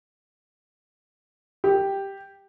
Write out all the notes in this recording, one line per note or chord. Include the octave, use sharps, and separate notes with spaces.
G4